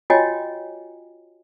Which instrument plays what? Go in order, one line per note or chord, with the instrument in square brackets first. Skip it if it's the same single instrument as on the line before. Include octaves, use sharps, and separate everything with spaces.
[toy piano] F4 F#4 C#5 D#5 G5 G#5